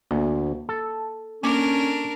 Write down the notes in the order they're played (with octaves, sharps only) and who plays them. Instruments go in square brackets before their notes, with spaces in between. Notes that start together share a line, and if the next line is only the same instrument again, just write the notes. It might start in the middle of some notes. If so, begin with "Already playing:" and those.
[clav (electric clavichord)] D2 [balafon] A#3
[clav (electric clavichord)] A4
[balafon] A#3 D6 [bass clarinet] C#4 [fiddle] D4 A#4